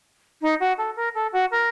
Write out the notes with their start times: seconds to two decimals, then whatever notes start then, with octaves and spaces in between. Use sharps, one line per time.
0.41 D#4
0.60 F#4
0.78 A4
0.96 A#4
1.14 A4
1.32 F#4
1.51 A#4